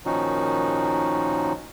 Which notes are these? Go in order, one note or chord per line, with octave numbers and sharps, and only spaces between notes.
A#2 D#3 F3 C#4 D#4 F#4